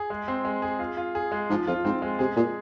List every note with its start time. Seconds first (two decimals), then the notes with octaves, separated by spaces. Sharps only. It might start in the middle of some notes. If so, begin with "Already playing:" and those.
Already playing: G#4
0.10 G#3
0.28 C4
0.45 G#3
0.62 G#4
0.79 F4
0.97 F4
1.15 G#4
1.32 G#3
1.50 G#2 F3
1.67 F2 F4
1.85 G#2 C4
2.02 G#3
2.19 C3 G#4
2.36 A#2 G#4